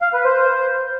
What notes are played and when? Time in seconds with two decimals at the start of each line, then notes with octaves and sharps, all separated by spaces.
0.02 F5
0.13 B4
0.25 C5